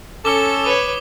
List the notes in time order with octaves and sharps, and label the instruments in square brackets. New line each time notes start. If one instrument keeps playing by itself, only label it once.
[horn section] C#4 A4 [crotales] D6 G7
[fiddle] B4 C#5 [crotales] D#6